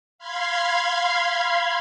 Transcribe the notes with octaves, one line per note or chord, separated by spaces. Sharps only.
F5 B5 C6 G#6